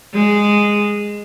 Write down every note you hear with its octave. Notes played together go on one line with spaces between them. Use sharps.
G#3